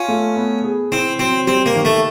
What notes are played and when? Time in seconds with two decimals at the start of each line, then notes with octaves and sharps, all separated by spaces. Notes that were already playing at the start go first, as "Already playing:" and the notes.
Already playing: C#4 F4
0.09 A3
0.36 B3
0.64 G#4
0.92 C4 E4
1.19 F#3 C4
1.47 G3 C4
1.66 A#3
1.76 D#3
1.85 A3